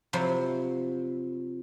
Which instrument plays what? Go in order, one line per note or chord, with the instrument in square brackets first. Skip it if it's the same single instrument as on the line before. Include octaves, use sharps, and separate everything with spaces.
[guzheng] C3 F3 F#3 E4